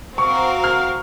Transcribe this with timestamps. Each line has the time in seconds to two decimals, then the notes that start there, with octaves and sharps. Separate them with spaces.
0.17 C4 F#4 A#4 F5 C#6
0.64 F6